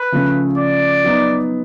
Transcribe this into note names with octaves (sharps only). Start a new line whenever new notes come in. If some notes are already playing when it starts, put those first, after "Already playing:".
Already playing: B4
C#3 F3 A3 C#4
D5
F#3 B3 D#4